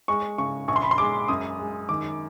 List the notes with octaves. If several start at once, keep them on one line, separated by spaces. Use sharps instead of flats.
G#3 C#6
C#3 C#6
A#1 C#6
C6
B5
C6
G#3 D6
F#2 D#6
G#3
D#3 D6